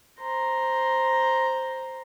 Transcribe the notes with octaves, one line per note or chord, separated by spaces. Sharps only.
C5 A#5